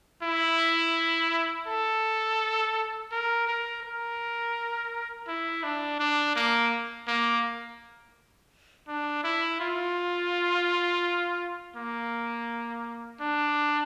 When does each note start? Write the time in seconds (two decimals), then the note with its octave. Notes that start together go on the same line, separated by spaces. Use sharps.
0.23 E4
1.67 A4
3.12 A#4
3.48 A#4
3.83 A#4
5.28 E4
5.64 D4
6.00 D4
6.36 A#3
7.08 A#3
8.88 D4
9.24 E4
9.60 F4
11.76 A#3
13.21 D4